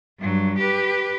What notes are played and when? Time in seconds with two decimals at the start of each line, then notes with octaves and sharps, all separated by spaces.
0.20 G2 F#3
0.58 G4 B4